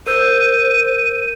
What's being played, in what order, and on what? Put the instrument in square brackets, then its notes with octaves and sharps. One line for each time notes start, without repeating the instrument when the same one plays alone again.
[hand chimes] A#4 E6 G6 [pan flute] C5 [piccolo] D#7